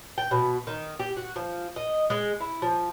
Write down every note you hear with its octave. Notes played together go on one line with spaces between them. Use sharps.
G5
B2
D#3
G4
F#4
F3
D#5
G#3
E4
F3